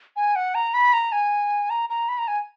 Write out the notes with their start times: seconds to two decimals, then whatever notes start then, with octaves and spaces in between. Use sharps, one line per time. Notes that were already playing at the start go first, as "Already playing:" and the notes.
0.16 G#5
0.36 F#5
0.55 A#5
0.74 B5
0.93 A#5
1.12 G#5
1.70 A#5
1.89 A#5
2.09 B5
2.19 A#5
2.28 G#5